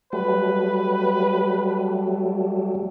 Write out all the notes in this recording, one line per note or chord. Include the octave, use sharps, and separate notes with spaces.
F#3 G3 A3 B4